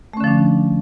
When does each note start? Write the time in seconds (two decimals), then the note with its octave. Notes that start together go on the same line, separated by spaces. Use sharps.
0.13 A3
0.17 C#4
0.20 D3
0.24 F3
0.27 D4